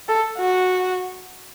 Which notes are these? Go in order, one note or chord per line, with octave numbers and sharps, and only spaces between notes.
A4
F#4